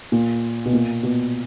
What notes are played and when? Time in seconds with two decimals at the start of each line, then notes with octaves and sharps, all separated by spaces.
0.12 A#2
0.65 B2
0.73 A#2
1.03 B2